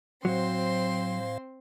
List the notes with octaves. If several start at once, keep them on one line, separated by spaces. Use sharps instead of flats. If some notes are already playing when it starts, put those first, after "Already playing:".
A2 F#3 C4 C5 F5 C6